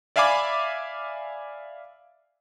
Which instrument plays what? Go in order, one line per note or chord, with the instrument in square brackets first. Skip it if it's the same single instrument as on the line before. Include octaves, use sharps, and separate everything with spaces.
[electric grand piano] D5 E5 F5 G#5 B5 D6